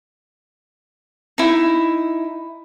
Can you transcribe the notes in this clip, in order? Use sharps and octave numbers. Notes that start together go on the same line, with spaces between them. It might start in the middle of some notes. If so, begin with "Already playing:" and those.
D#4 E4